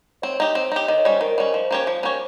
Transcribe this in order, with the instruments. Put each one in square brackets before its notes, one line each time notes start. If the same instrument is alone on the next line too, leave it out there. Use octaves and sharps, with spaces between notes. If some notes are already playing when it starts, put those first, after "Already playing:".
[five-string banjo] C4 [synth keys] C#5
[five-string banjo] D#4 G4
C4
D#4 G4
[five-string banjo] D#3 [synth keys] D#5
[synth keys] C#5
[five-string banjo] G3 C#4 [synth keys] C5
[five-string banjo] D#3 [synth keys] A#4
[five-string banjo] G3 C#4
[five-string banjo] F3 [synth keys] C5
[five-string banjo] A#3 C#4 G4 C#5
F3
A#3 C#4 G4 C#5